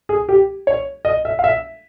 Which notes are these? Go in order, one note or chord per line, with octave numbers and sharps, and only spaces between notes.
G#4
G4
C#5
D#5
E5
F5
E5